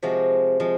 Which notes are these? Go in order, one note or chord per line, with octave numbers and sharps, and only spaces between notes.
C3 F3 G#3 F#4
F3 G#3